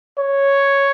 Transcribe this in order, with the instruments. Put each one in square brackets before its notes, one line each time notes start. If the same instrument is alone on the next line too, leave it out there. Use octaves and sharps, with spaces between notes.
[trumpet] C#5